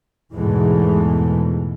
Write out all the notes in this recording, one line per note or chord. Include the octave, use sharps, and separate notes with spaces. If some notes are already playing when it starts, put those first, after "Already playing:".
E2 G#2 B2 E3 G#3 A3